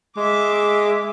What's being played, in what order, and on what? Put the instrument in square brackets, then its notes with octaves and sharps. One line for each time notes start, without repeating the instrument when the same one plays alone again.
[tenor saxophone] G#3 [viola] E5 D6